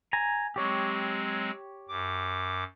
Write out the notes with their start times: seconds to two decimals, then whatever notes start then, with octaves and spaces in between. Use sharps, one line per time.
0.13 G#5 A#5
0.56 F#3 G#3 C4 G4 C#5
1.89 F#2 D6